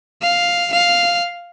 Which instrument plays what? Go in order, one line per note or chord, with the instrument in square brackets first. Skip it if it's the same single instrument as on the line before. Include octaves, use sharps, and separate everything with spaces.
[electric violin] F5
F5